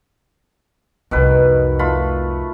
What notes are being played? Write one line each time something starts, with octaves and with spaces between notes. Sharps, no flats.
C2 F2 B2 D#3 B4
A3 F4 B5